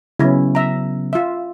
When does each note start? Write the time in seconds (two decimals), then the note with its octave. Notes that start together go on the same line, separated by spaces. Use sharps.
0.19 C#3 F#3 B3 C#4 E4
0.55 E5 A#5
1.13 F4 E5